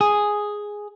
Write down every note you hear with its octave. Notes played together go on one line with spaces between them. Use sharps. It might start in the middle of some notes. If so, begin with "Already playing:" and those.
G#4